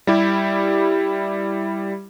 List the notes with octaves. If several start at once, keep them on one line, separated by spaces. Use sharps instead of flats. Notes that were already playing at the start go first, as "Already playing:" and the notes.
G3 E4 G4